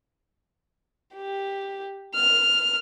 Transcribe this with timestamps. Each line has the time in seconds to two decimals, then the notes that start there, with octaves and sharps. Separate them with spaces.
1.15 G4
2.14 F6